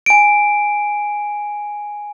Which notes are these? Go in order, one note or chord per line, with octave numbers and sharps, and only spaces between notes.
G#5 D7